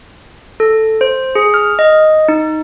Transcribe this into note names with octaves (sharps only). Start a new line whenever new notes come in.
A4
C5
G#4
F6
D#5
D#4